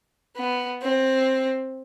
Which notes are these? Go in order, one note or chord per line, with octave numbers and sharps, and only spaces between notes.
B3
C4